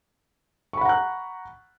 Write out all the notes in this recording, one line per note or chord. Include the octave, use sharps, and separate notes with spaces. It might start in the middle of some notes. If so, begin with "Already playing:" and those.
F#5 A#5 B5 C#6 F#6